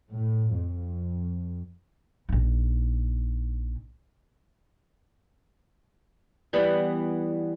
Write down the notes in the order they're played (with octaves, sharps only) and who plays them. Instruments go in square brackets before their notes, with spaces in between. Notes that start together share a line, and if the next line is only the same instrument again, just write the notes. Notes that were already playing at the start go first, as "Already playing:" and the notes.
[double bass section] A2
F2
[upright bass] A#1 D#4
[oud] E3 G3 B3